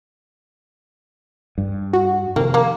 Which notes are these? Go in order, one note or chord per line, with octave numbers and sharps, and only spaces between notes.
G2
F#4
F2 C3 D#3 A#3
A#3